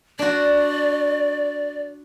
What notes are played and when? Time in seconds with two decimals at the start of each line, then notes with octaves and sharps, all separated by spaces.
0.19 D4 F#4 D5